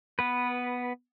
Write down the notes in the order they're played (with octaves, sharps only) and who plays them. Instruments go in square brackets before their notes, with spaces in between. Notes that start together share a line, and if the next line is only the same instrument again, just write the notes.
[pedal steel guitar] B3 B4